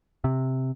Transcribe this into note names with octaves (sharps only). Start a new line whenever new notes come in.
C3